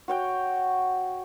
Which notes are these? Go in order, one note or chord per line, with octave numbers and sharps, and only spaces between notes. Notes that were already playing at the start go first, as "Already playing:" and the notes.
F#4 C#5 G5